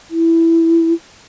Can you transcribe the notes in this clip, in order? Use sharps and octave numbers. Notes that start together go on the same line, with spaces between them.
E4